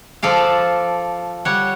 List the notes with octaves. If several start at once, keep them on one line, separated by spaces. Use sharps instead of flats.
F3 A4 D5 F5
G3 C#5 F#5